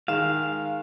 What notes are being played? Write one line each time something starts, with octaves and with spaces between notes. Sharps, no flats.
D#3 G#3 F5 E7